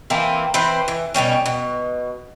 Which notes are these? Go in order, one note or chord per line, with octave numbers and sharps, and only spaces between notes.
E3 A#3 C4
E3 C4 B4 C5
E3
B2 D#3 G3 C#4
B2